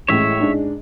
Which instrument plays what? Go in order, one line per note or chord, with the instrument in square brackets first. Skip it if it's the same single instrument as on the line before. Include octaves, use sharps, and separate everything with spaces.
[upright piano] A1 A2 G#3 [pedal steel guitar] C#5 E5
[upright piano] G#2 G#3 D4